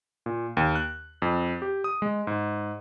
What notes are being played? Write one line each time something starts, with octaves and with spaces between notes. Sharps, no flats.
A#2
D#2
F#6
F2
G4
D#6
G#3
G#2